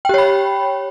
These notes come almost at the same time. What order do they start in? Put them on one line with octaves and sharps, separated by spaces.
G5 G4 C#5 B5